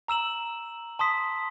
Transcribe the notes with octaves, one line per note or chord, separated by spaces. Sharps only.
A#5 E6 E7 F#7
A5 C6 D#6 B6